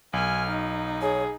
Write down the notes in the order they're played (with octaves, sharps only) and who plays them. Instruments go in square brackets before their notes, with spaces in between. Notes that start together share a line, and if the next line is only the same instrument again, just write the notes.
[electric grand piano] B1 [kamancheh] G#5 F6
[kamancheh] D#4
[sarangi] G#4 [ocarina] C#5